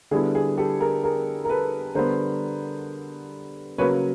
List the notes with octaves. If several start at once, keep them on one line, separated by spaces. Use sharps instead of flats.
D3 G3 B3 E4 G#4
G#4
G4 A4
G#4 A#4
G#4 A#4
A#4
A4 B4
D3 G3 B3 A#4 C5
C#3 F#3 A#3 B4 C#5